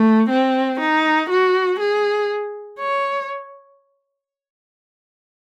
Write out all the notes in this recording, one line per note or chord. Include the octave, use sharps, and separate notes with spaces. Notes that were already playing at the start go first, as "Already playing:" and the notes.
Already playing: A3
C4
D#4
F#4
G#4
C#5